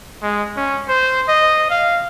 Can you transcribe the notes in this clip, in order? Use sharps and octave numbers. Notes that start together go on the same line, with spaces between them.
G#3
C#4
C5
D#5
F5